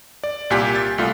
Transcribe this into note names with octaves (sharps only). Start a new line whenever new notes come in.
D5
C2 A#2 G4 G#5 B6
A6
C2 A3 F4